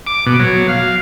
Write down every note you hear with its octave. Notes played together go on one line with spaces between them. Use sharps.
D6
B2
F#3
F5